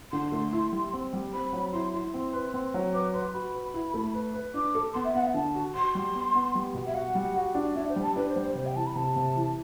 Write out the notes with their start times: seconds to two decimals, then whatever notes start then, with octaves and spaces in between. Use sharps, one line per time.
0.12 D3 C6
0.32 A3
0.53 E4
0.72 G3
0.93 C4
1.13 G3
1.33 C4 B5
1.53 F#3
1.73 E4 C6
1.94 E4 C6
2.14 C4
2.33 B4
2.54 C4
2.74 F#3
2.94 B4 D6
3.14 B4 C6
3.34 F#4 B5
3.54 B4
3.74 E4
3.94 A3
4.14 B4
4.34 B4
4.54 D4 D6
4.75 A4
4.94 B3 C6
5.05 E5
5.14 B3 F#5
5.24 E5
5.34 D3 A5
5.55 F#4
5.75 F#4 C6
5.95 G3
6.15 B3
6.35 B3
6.55 G3
6.75 B2
6.87 E5
6.95 F#4 F#5
7.15 G3
7.36 F#4
7.55 D4
7.75 D4 E5
7.89 C5
7.96 G3
8.02 A5
8.16 D4 B4
8.29 C5
8.36 G3
8.43 C5
8.55 C3 C5
8.66 G5
8.76 E3 A5
8.86 B5
8.96 C3 A5
9.16 C3
9.36 E3